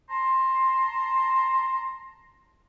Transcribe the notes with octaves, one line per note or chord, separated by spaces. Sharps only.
A5 A#5 C6